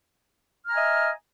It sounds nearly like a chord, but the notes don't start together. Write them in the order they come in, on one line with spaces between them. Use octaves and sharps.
F6 A#5 G#5 D#5 E5